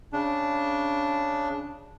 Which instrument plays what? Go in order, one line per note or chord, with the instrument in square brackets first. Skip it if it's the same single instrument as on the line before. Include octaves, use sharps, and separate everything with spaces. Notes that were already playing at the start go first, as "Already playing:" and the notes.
[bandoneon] C#3 D4